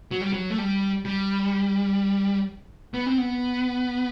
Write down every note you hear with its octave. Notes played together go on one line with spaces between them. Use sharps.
F#3
G3
F#3
A3
G3
G3
B3
C4
B3